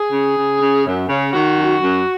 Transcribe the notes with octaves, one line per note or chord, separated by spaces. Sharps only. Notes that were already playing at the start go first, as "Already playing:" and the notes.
Already playing: G#4
C#3
C#3
C#3
F#2
C#3
D#3 F#4
F#2
F#2